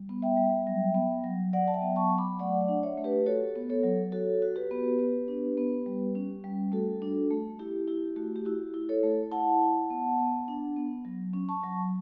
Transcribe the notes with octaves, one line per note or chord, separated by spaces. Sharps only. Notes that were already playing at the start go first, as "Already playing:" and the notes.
Already playing: G3
B3
E5 G5
G3
F#3
B3
F#3
F#3 D5 F#5
A5
E5 G5
B3
A5 C#6
F#3
B5 D6
A3 D5 F#5
D5 F#5
D4
C#5 E5
A3
G4 B4
F#4 A4 C#5
B3
A4 C#5
F#3
F#4 A4 C#5
F#4
G4 B4
B3
B3
D4
B3
G3
C#4
G3
A3 F#4 A4
D4
A3
E4 G4
E4 G4
A3 F#4
G4
E4 F#4
E4
A4 C#5
A3
E4 F#5 A5
E4
B3
B3
D4
B3
F#3
C#4
A5 C#6
F#3